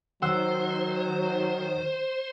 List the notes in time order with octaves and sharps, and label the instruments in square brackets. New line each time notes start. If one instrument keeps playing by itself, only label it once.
[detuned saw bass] D#3 [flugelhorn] F#3 [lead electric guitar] C5 [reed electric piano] F#5 E6